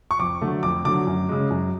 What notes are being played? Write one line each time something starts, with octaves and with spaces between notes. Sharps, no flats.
C#6
F2 D6
D3 F#3 A3
F2 D6
D3 F#3 A3 D6
F#2
C#3 G#3
F#2